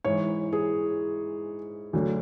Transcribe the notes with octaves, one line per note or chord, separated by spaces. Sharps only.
G#2 E3 C#5
G#4
D2 D3 F#3